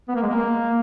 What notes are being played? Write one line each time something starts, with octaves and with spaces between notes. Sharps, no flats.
B3
A#3
G#3
A#3